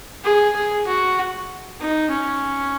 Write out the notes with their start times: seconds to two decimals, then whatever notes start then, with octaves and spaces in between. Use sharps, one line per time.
0.24 G#4
0.56 G#4
0.87 F#4
1.80 D#4
2.10 C#4